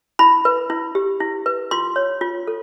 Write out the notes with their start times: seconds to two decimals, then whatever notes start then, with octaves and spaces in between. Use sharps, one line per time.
0.19 E4 B5
0.45 B4
0.70 E4
0.95 G4
1.20 E4
1.46 B4
1.71 F4 C6
1.96 C#5
2.21 F4
2.47 A4